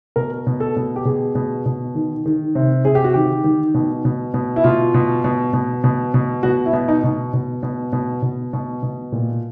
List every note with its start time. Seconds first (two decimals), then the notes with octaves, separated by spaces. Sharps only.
0.16 B2 A#4
0.47 B2
0.60 A4
0.76 B2
0.96 G4
1.05 B2 G#4
1.35 B2
1.66 B2
1.95 D#3
2.26 D#3
2.55 C3
2.85 C3 G#4
2.95 G4
3.04 F#4
3.14 D#3 G4
3.44 D#3
3.74 B2
4.05 B2
4.34 B2
4.56 E4
4.64 B2 F4
4.94 B2
5.24 B2
5.53 B2
5.84 B2
6.14 B2
6.43 B2 F#4
6.66 E4
6.73 B2
6.88 D#4
7.04 B2
7.33 B2
7.63 B2
7.93 B2
8.22 B2
8.53 B2
8.83 B2
9.12 A#2